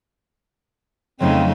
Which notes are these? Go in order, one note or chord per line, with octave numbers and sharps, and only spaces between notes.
F2 C#3 F#3 A3 C4 D#4